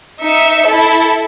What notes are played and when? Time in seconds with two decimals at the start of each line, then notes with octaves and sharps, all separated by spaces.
0.22 D#4 E5 C#7
0.68 E4 A4